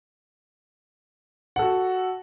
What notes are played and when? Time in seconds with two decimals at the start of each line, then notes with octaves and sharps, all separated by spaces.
1.56 F#5
1.59 A4
1.62 F#4